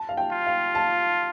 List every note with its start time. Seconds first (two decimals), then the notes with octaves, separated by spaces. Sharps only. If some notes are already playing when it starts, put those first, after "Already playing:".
Already playing: A5
0.09 F5
0.17 G5
0.32 F4
0.47 F5
0.75 A5